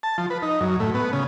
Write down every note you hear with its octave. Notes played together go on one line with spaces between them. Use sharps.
A5
F3
B4
D#4
F#2
A2
B3
C#3